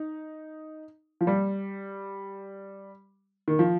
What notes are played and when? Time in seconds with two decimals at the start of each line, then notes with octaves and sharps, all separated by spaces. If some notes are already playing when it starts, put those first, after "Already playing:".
Already playing: D#4
1.21 F3
1.27 G3
3.48 D#3
3.59 F3